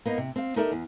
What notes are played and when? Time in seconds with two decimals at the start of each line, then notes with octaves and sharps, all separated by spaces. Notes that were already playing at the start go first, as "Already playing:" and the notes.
0.06 A#3 B3 D#4
0.18 C3
0.36 C4 F5
0.56 D#4 G4 A4 A#4 D5 E5
0.72 E2